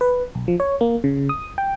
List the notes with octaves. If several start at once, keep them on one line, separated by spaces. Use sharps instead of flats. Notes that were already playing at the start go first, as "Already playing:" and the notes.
B4
B1
F3
C#5
A#3
C#3
D#6
G5